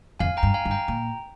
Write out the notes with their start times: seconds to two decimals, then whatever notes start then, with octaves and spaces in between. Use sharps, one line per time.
0.19 F2 F5 G#5
0.37 G5 A#5
0.43 G2
0.54 F5 G#5
0.65 G2
0.71 G5 A#5
0.88 A#2